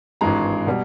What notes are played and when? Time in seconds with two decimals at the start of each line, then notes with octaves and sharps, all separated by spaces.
0.21 G#1 G2 E3 G#3 A#5
0.67 B2 G3